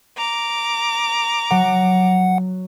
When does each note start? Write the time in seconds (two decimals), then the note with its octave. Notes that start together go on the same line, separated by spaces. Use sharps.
0.17 A#5 D6
1.51 F#3 F#5